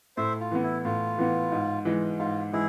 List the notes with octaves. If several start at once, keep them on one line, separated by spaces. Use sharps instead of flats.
A2 C5 E5
F4
E3 B3
E4
A2 F4
E3 B3
G#2
E3 G#3
G#2 F4
E3 G#3 E4 G#4